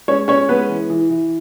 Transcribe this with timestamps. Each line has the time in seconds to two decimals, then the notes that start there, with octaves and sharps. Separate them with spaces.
0.08 G#3 C#4 C#5
0.28 C#4 C#5
0.49 G#3 B3 B4
0.69 E3
0.90 E3
1.10 E3